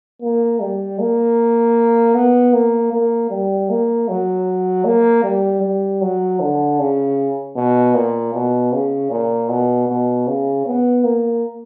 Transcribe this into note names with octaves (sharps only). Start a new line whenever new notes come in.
A#3
G3
A#3
B3
A#3
A#3
G3
A#3
F#3
A#3
G3
G3
F#3
D3
C#3
B2
A#2
B2
C#3
A#2
B2
B2
C#3
B3
A#3